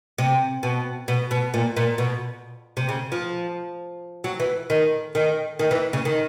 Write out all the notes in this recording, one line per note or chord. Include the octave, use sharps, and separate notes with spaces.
C3
B2
B2
B2
A#2
A#2
B2
C3
C#3
F3
F#3
E3
D#3
D#3
D#3
E3
C#3
D#3